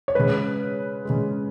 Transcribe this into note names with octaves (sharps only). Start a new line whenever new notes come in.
C#5
C#3 G#3 B4
C#3 G#3